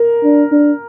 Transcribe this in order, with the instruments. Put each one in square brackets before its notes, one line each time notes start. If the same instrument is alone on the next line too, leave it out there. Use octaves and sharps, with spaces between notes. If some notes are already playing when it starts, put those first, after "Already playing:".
Already playing: [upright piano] A#4
[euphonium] D4
D4